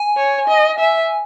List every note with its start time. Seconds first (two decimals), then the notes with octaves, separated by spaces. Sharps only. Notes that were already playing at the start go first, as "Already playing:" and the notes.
Already playing: G#5
0.17 C#5
0.48 D#5
0.79 E5